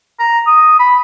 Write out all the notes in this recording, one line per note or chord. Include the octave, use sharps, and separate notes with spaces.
A#5
D#6
B5